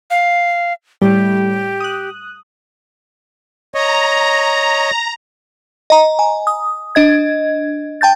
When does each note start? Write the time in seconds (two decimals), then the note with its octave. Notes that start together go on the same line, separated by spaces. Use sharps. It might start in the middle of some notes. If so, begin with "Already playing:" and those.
0.10 F5
1.02 A2 G3 G4
1.80 D#6 F#6
3.75 C#5 D#5 A#5
5.90 D#5 A#5
6.19 G#5
6.47 D#6
6.95 D4 D#5 G#6
8.01 G5 A5 G6 A6